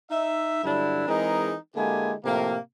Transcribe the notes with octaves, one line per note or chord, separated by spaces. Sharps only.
D#4 E5
G2 D3 F#3 D4 E4
E3 G#3 C4 D#4 G#4 A#4
D3 G#3 A#3 E4 G4 G#5
A2 C3 F3 A#3